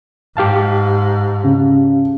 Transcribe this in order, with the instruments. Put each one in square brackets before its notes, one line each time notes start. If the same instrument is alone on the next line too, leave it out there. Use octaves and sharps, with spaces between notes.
[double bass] G#2 [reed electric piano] G4 F5 A5
[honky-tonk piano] C#3